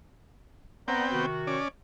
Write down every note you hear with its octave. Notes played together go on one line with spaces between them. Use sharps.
B3 C4 D5 F#5 G5 A#5
C3 D#3 F#4
C#4 D5